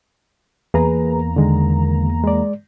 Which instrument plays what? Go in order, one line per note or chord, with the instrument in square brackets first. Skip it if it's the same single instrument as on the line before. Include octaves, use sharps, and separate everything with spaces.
[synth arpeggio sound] E2 A#3 A#5 [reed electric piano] G#4 B4
[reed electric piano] D3 D#3 G#3
G#3 D5